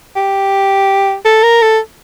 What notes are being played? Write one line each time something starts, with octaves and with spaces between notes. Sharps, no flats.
G4
A4
A#4
A4